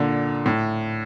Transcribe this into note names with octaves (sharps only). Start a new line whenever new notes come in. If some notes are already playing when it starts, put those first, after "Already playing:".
Already playing: A#2 D3
A2